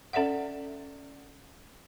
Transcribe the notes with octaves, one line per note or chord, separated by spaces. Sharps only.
C#4 A4 D5 E5 F#5